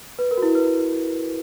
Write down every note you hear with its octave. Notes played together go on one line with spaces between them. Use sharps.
B4
A#4
F#4
E4
B4